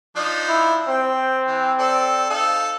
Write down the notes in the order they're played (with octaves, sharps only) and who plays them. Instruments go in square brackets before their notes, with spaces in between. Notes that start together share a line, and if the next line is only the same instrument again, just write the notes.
[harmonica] F3 D4 D#4
[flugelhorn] E4
[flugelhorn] C4 [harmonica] G5
[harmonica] E3
A4 D5
D#4 A4 F5